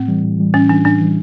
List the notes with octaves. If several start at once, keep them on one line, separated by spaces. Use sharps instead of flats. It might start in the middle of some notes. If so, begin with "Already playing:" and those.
Already playing: A2 C4
E3 G3
A2
E3 G3
A2 C#4
E3 G3 D4
A2 D4
E3 G3